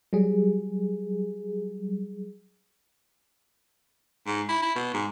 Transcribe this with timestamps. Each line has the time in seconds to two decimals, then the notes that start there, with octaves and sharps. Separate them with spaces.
0.13 F#3 G3 G#4
4.27 G#2
4.49 E4
4.62 E4
4.76 B2
4.94 G#2